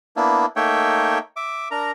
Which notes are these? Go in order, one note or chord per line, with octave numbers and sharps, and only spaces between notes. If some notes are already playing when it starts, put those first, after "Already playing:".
A#3 B3 D4 E4
A3 A#3 D#4 C#5 E5 G5
E5 D6
D4 A#4 A#5